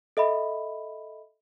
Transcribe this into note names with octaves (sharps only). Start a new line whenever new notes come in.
A4 D#5 E5 B5